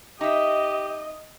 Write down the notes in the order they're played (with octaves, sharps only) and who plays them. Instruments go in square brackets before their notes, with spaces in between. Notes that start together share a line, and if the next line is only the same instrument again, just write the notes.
[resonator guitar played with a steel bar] D#4 E5 [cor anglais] G4 [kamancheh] D#5